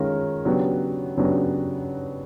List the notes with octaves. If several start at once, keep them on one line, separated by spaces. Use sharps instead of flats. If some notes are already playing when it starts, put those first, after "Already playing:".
Already playing: D#3 G#3 C#4 F4 A#4
C#3 F#3 B3 D4 G4
C#3 F#3 B3 D4 G4